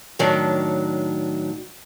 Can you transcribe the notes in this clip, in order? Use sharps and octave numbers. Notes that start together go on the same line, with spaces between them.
A2 D#3 F#3 D4